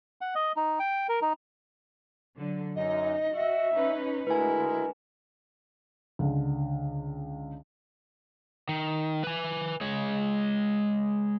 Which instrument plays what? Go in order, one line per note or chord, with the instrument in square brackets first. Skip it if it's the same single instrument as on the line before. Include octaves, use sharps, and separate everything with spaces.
[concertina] F#5
D#5
D#4
G5
A#4
D#4
[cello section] D3 F#3
[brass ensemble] F#2 [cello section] D#4 [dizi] D#5
[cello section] F#4 [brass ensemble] E5
[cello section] C#4 D#4 B4
[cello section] D3 A3 [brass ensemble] G#3 F#4 A#4 [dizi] E4 [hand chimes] B4 G#5
[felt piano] C#2 D3
[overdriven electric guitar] D#3
B4 G#5
G#3 C#5